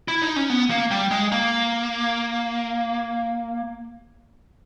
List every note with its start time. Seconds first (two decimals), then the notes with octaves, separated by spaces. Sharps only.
0.08 E4
0.22 D#4
0.36 C#4
0.50 B3
0.70 A#3
0.91 G3
1.11 G#3
1.32 A#3